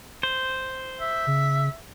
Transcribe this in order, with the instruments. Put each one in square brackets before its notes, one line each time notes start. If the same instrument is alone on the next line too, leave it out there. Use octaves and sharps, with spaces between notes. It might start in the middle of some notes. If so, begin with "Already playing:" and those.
[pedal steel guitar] C5
[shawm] E5
[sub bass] C#3